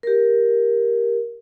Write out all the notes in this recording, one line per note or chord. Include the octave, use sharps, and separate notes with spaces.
G4 A#4